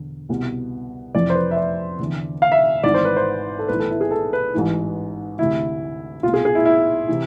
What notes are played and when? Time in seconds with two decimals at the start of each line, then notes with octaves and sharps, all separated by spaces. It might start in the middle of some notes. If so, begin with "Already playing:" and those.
Already playing: E1 D3
0.29 C2 B2
1.15 F1 F2 E3 D5
1.30 C5
1.35 B4
1.51 E5
1.56 D5
1.99 F1 E2 D3
2.42 F5
2.52 E5
2.84 G#1 G#2 E3 D5
2.94 C5
3.05 B4
3.16 C5
3.59 A4
3.68 B1 A2 E3 B4
3.79 A4
3.91 E4
4.01 G#4
4.11 A4
4.33 B4
4.54 A1 G#2 E3
5.38 D2 C3 E3 E4
6.23 C2 B2 F4
6.34 G#4
6.45 G#4
6.55 E4
6.65 E4
7.08 C3 E3